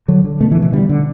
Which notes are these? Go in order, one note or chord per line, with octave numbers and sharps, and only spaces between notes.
D3 F#3
D3
B2 A3
E3
B2
E3
D3 G3
D3